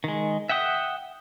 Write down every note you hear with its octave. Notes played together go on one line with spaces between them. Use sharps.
D#3 G#3
E5 F#5 G5 D#6